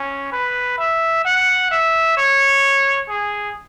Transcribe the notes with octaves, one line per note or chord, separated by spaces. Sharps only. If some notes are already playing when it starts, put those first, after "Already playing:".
Already playing: C#4
B4
E5
F#5
E5
C#5
G#4